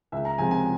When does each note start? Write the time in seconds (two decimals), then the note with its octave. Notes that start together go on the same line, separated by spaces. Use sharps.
0.12 C#2 E5
0.25 A#5
0.38 C3 F3 G#3 G#5
0.51 G#5